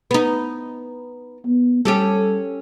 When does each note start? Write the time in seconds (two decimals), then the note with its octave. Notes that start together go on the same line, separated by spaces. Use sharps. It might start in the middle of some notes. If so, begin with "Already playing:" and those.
0.11 B3 D#4
1.46 B3
1.85 G3 C#4 G4 A4